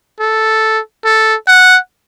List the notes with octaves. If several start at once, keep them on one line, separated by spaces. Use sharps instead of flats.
A4
A4
F#5